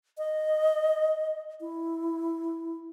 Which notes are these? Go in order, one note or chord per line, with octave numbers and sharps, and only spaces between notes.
D#5
E4